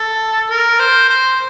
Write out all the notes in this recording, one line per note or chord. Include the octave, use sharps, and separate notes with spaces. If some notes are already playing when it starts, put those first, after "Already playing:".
Already playing: A4
A#4
C5
C5